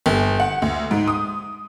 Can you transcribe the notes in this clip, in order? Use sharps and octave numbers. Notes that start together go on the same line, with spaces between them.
G1
F#5
D2
G#2
D#6